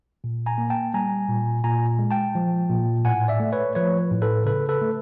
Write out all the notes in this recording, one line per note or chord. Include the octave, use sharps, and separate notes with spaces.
A#2
G#5 A#5
A#3
G5 A5
G3 G#5 A#5
A#2
A#2 G#5 A#5
G#3
G5 A5
F3
A#2
A2 F#5 G#5
D5 E5
A3
B4 C#5
F3 B4 C#5
A2
A4 B4
C#3 A4 B4
A4 B4
A3